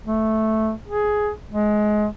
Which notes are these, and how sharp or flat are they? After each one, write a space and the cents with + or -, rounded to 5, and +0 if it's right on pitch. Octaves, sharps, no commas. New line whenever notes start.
A3 -5
G#4 +10
G#3 +20